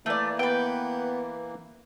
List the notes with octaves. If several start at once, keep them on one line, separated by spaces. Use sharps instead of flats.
E3 A3 A#3 D5
B3 B4 G5